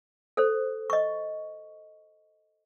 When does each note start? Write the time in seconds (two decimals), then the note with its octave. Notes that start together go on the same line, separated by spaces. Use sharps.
0.37 A4 C5
0.90 D#5 C#6